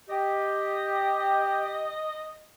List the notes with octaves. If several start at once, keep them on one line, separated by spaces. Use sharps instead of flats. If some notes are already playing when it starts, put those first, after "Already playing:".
G4 D#5